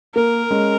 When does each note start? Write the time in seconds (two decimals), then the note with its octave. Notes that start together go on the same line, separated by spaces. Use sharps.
0.15 A#3 A#4
0.51 G#3 C#4